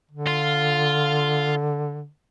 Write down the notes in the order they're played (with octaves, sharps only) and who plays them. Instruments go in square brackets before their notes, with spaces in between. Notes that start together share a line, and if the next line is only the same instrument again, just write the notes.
[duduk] D3
[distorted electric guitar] F4